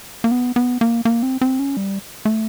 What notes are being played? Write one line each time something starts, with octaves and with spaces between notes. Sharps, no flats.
A#3
B3
B3
A#3
A#3
C4
C4
C#4
G3
A3